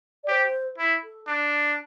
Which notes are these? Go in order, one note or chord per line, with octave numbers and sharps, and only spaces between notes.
D5
G4 C5
E4
A4
D4